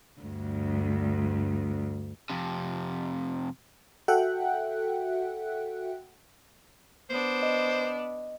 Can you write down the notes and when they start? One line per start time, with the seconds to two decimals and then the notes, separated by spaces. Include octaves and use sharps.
0.20 D2 G2
2.30 F2 C3
4.08 F#4 A4 E5 F#5 G5 F#6
7.10 B3 D4 C5
7.43 D#5